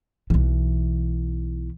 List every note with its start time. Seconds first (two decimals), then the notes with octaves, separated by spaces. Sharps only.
0.30 B1 E3